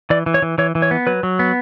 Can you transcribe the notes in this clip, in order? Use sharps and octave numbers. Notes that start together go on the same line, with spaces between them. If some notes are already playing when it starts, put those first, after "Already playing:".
E3 D5
E3
C#5
E3
E3 C#5
E3
C#5
B3
F#3 B4
F#3
B3